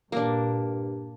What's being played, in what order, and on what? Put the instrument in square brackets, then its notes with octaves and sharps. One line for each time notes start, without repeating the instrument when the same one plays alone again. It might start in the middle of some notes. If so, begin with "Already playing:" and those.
[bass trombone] G2 [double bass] A#2 [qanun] A#3 D4